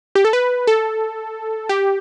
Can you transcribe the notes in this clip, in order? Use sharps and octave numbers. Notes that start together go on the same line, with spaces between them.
G4
A4
B4
A4
G4